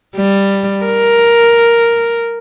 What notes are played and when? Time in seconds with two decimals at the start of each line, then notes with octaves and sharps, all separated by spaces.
0.16 G3
0.85 A#4